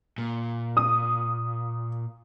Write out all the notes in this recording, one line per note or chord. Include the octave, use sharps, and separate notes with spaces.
A#2
D#6